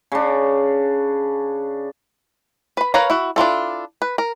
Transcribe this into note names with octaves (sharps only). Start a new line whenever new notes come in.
C#3 D4
B4 B5
A#4 B4 C#5 F5 A#5
E4 F#4
D4 E4 F4 A4
B4
A#4